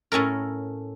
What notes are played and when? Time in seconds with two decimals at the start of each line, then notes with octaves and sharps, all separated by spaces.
0.12 A2 C#4 A4 A#4